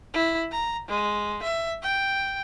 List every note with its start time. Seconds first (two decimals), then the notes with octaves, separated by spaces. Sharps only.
0.14 E4
0.51 A#5
0.88 G#3
1.43 E5
1.82 G5